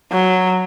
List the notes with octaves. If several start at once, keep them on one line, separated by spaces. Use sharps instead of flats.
F#3